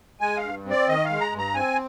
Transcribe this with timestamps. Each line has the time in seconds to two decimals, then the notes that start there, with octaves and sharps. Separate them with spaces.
0.20 G#3 G#5
0.37 F5
0.43 G2
0.65 C4 D5
0.88 D#3 D#5
1.05 F5
1.10 G#3
1.21 A#5
1.32 G2
1.38 A#5
1.54 C4 G#5